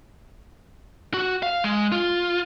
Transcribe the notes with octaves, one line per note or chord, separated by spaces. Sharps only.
F#4
F5
G#3
F4